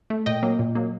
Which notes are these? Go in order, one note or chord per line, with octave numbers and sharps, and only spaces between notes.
A3
A#2 D#5 G5
F#3 A#3
A#2
F#3 A#3